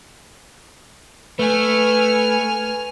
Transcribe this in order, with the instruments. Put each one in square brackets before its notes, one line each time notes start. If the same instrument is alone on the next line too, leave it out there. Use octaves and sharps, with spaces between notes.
[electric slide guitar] A3 [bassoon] B4 [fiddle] G#5 F6